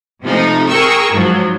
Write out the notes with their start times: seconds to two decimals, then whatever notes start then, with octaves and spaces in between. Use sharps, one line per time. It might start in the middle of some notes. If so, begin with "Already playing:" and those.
0.22 C3 F3 A3 D#4
0.68 G#4 A#4 G5 C#6 E6
1.11 G#2 F3 F#3